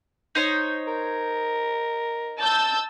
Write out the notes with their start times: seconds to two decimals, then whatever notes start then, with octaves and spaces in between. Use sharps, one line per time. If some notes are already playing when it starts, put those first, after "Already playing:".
0.35 D#4 C5 C#5
0.87 A#4
2.40 A5 E6 G6